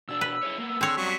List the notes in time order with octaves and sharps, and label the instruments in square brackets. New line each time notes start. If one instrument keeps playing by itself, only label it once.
[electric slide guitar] B2 D4 [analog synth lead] E6
[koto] B4
[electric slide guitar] E4 G#4 C#5
A#3 B3
[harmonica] D3 [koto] C4 C#5 [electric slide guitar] G#4
[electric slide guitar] G2 C#4 [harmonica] F#3 G3 C#6 [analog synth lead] B6